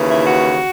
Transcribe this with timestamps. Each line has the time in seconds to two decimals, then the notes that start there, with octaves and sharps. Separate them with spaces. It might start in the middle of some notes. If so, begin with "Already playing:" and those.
Already playing: D#2 C#3 E3
0.10 E4
0.25 F#4